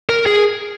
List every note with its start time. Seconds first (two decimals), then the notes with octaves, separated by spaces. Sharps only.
0.09 A#4
0.26 G#4